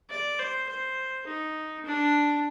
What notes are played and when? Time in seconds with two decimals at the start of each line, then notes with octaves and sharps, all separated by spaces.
0.10 D5
0.39 C5
0.68 C5
1.26 D#4
1.85 D4